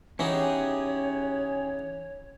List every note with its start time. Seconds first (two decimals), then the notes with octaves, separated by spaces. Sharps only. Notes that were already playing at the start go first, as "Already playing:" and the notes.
0.19 E3 B3 C#4 D#4 G4 G#4 C#5